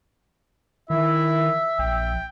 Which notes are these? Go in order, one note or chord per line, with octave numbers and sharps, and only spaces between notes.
D#3 E4 E5
A#1 G5